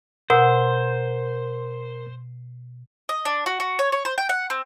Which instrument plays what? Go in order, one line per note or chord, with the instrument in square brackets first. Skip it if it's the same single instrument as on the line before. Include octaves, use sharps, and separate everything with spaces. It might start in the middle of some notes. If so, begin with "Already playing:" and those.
[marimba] B2 E6 [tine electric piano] A#4 [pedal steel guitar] C5 [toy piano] F#5
[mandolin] D#5
D4
F#4
F#4
C#5
C#5
C5
G5
F#5
C4